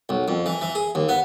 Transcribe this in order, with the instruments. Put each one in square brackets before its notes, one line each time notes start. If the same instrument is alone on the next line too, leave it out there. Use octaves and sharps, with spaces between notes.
[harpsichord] B1
F2
E3
E3
G#4
D#2
B3